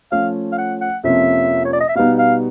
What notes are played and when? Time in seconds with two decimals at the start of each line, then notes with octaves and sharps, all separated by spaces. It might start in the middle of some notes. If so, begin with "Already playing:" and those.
0.12 F3 A3 C#4 F5
0.52 F5
0.58 F#5
0.81 F#5
1.04 F2 C3 F3 A#3 C#4 E5
1.65 C#5
1.73 D5
1.80 D#5
1.88 E5
1.95 B2 G3 B3 D#4 F5
2.18 F5